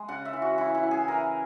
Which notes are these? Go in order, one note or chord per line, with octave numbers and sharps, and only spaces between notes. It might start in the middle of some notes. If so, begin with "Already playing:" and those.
Already playing: G#3
C#3 F#5
E5
E3
F#4
E3 E4
E4
C#4
G#4
E3 A#4